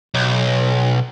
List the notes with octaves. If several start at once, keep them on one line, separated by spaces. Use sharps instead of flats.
B1